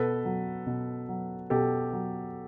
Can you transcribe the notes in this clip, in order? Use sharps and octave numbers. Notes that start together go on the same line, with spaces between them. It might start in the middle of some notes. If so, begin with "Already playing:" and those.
Already playing: B2 A4 B4
F#3
B2
F#3
B2 G4 A4
F#3